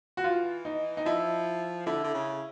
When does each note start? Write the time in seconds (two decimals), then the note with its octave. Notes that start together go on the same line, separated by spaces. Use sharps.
0.17 F#4
0.24 E3 F4
0.65 D#4
0.97 D#4
1.05 F3 E4
1.86 D3 E4
2.04 D3
2.14 C#3